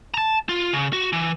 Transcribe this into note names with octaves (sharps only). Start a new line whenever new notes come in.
A5 A#5
F4
C#3
F#4
E3